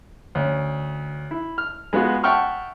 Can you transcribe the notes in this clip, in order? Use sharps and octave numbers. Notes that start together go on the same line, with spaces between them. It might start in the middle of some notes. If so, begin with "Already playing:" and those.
D2 C#4
E4
F6
G#3 B3 F4 F#4
E5 F#5 G5 A5 C#6 F6